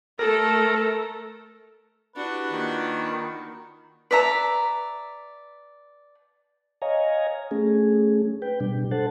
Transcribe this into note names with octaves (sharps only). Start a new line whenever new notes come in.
A3 A4 A#4
D4 E4 F#4 G4 B4 D5
D#3 A#3 F4 D5
B4 D5 E5 A#5
C#5 D#5 F5 G#5 A#5
A3 C#4 G#4
B4 G5
B2 G3 D4
A4 C5 F#5 A5